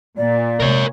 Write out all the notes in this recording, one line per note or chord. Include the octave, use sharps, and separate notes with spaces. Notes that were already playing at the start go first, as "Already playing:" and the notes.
A#2 D5
C3 G#3 A#4 C#5